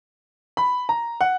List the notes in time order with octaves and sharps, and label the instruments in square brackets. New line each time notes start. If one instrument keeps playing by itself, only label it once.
[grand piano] B5
A#5
F#5